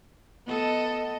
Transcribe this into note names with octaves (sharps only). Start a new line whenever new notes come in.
B3 A4 D#5